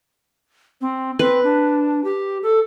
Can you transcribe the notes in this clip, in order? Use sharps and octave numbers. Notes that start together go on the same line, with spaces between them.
C4
C4 B4
D4
G4
A4